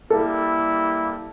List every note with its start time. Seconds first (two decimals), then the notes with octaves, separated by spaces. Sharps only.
0.10 G3 A#3 E4 A4